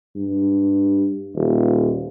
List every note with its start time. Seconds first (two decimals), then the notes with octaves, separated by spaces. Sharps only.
0.16 G2
1.35 D#1